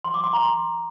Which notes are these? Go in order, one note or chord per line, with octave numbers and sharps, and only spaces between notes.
C6
D6
C6
A#5
C6